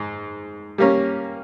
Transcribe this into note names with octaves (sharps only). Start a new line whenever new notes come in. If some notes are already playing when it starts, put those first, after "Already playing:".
Already playing: G#2
G3 A#3 C#4